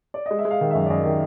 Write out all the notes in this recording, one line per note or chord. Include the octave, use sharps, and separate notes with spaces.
D5
G#3 D#5
E5
G#3
F5
D#3
F#2 E5
D5
F#2 D#5
D#3